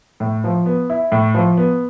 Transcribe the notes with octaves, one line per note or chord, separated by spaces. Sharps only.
A2
F3
B3
E4
A2
F3
B3